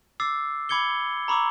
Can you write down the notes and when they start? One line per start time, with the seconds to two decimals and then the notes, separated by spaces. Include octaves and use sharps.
0.20 D6 E6 A6 C7
0.69 B5 D6 G#6 C#7 G7
1.28 A#5 B5 C#6 D6 E6